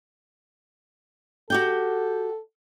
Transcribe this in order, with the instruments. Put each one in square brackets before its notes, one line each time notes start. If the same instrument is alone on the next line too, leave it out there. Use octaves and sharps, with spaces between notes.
[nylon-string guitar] F#4 G4 G5 [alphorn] A4